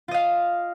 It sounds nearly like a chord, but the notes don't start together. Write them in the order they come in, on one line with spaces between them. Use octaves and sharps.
F4 D#5 F5